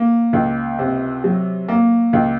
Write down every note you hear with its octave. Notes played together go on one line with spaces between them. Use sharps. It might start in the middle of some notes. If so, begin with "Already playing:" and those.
Already playing: A#3
C#2
C3
F#3
A#3
C#2